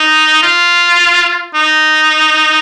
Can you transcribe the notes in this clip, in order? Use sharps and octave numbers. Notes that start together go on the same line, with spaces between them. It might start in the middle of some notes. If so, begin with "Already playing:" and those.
Already playing: D#4
F4
D#4